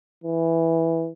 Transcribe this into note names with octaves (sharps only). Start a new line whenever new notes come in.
E3